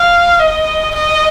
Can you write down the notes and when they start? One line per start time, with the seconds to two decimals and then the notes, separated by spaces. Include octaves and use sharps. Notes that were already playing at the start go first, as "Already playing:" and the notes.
Already playing: F5
0.40 D#5
0.95 D#5